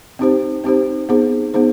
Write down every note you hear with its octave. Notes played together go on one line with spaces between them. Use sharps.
C4 D#4 G4 C5
C4 D#4 G4 C5
B3 D#4 G#4 C5
B3 D#4 G#4 C5